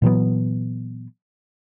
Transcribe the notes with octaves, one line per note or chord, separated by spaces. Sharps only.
A#2 E3 F#3 B3